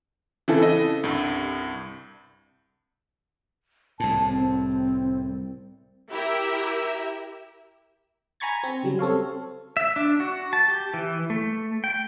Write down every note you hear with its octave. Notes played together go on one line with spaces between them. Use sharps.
C#3 E3 C4 E4 A4
D#5
C2 G2
C2 A2 A5
C4
E4 G4 A#4 E5
G#5 A#5 B5 C#6 G#6 A6
C4
C#3 F#3 G3
C4 A4 C#5 F5
E5
D4
F#4
A5
G4
E3
A3
G5